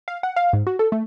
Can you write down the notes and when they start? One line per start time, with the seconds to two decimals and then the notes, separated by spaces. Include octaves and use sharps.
0.08 F5
0.23 F#5
0.36 F5
0.53 G#2
0.67 F#4
0.79 A4
0.92 A3